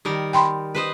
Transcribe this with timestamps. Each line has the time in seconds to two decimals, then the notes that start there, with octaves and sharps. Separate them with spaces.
0.05 D#3 G3 A#4
0.33 G5 B5 C6
0.75 B4 C5 D#5